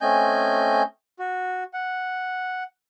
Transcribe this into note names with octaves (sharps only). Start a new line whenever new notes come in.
A3 C4 C#4 D#5 G#5 G6
F#4
F#5